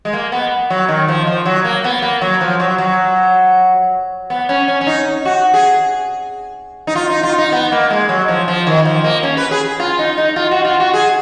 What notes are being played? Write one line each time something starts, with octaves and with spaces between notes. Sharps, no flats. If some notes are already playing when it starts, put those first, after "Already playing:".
G#3
A#3
B3
F#3
D#3
F3
F3
F#3
A#3
B3
A#3
F#3
F3
F#3
F#3
B3
C#4
C#4
C#4
D#4
F#4
G#4
D#4
F4
D#4
F4
D#4
B3
A#3
G#3
F#3
F3
F3
D#3
F3
A#3
C#4
B4
G#4
F4
D#4
D#4
F4
F#4
F4
F#4
G#4